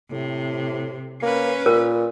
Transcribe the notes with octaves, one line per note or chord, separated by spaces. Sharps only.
A2 C3
A#3 C#4 B4
A#2 A#4